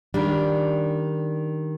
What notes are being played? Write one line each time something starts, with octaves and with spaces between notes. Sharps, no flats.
D#3 G3 D4